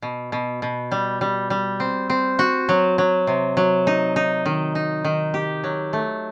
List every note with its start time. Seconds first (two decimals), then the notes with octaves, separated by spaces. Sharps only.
0.02 B2
0.32 B2
0.62 B2
0.92 G3
1.21 G3
1.50 G3
1.80 C4
2.10 C4
2.39 F#4
2.69 F#3
2.98 F#3
3.27 C3
3.57 F#3
3.87 D#4
4.16 D#4
4.46 D#3
4.75 D#4
5.04 D#3
5.34 G4
5.64 F#3
5.93 A3